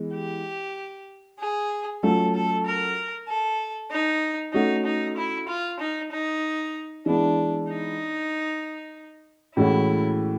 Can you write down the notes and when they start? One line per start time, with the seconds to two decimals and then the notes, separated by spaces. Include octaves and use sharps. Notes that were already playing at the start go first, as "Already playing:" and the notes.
Already playing: E3 G#3 B3
0.15 G4
1.40 G#4
2.03 F#3 A3 C#4 F4 A4
2.34 A4
2.66 A#4
3.29 A4
3.91 D#4
4.54 A3 C#4 D#4 F#4
4.86 D#4
5.16 E4
5.49 F4
5.80 D#4
6.11 D#4
7.06 E3 G#3 B3 D4 E4
7.68 D#4
9.57 A2 E3 G#3 C#4 E4 F#4